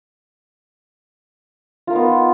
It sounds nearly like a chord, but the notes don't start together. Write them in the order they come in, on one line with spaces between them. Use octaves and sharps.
F4 A#4 D#4 B3